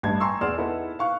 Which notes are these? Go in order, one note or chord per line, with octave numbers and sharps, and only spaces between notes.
A1 G2 A5 G#6
G5 G#5 A#5 C6 C#6 E6
E2 G#4 D5 C6 F6 E7
B3 D#4 E4 A4
F5 C#6 F#6